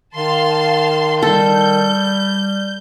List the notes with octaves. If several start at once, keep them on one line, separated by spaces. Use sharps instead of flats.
D#3 F5 A5 C6
G3 A4 G6